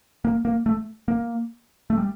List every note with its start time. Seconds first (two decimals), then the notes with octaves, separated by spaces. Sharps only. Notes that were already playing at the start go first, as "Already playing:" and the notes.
0.25 A#3
0.45 A#3
0.66 A3
1.08 A#3
1.90 A3
1.98 G3